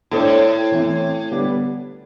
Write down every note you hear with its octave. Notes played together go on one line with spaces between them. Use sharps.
A2 A3 D4 A4 C5
E3 A3 C4
D3 G3 B3 D4